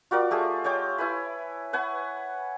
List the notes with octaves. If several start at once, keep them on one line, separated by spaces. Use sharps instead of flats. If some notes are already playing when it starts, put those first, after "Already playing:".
F4 F#4 A#4 D5
A3 G4 G#4
C#5 D#5 G5 D6
E4 B4 G#5 B5
B4 F#5 G#5 C#6